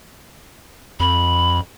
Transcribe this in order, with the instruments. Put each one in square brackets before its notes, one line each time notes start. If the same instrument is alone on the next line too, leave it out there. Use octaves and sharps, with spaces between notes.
[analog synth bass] F2 [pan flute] B5